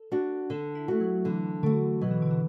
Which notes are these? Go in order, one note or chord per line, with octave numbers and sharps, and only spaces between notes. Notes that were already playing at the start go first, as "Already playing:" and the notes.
Already playing: A4
D4 F#4
D3 A4
E4
A3 F#4
F#3
D3 E3
D3 A3 F#4
B2 F#3
E3
D3
E3